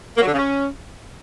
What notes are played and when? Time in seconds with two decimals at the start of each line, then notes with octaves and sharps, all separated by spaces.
0.17 A#3
0.22 F#3
0.27 D3
0.32 C#3
0.38 C#4